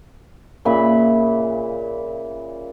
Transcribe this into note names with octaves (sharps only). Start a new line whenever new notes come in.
A#2 C#3 E5 B5